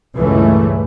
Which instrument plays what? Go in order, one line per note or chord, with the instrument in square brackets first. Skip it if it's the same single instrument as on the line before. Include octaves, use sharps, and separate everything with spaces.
[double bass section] C#2 G2 A#2 E3 A3